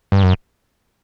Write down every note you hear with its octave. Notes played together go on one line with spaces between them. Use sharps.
G2
F#2